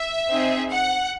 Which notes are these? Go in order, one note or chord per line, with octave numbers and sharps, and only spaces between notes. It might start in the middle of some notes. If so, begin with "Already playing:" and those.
Already playing: E5
C4 D#4 G#4
F#5